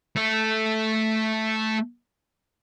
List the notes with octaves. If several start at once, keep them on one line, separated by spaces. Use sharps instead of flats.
A3 A4